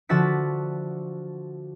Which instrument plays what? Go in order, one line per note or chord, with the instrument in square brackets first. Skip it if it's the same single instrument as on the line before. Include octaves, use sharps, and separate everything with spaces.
[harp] D3 F3 F#4 E5 A6 B6